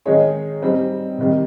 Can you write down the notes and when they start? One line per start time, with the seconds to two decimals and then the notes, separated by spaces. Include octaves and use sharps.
0.06 D#3 G#3 D#4 G#4 C#5
0.62 G3 C4 D#4
1.18 C3 D#3 G3